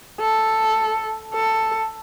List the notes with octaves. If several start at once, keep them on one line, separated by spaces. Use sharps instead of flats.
A4
A4